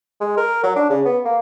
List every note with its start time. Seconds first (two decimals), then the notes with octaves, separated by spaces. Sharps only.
0.21 G#3
0.38 A#4
0.64 F#3
0.76 D4
0.90 C#3
1.05 B3
1.25 A#3